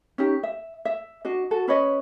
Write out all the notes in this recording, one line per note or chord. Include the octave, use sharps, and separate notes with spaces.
C#4 D#4 G4
E5
E5
D4 F#4 D#5
F#4 A4
C#4 B4 C#5 D#5